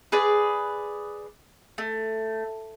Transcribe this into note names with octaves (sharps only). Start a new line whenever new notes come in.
G#4 B4 D5
A3